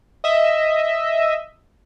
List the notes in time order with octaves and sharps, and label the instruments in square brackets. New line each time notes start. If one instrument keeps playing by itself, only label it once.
[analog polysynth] D#5 E5